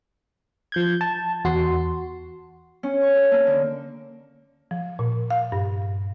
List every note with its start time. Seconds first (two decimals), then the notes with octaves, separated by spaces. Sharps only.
0.72 F3 G6 G#6
1.01 A5
1.44 E2 F#4 C6
2.83 C#4
3.02 C#6
3.17 A4
3.31 A#3
3.47 D3
4.71 F3
4.99 A#2
5.30 F5
5.52 G2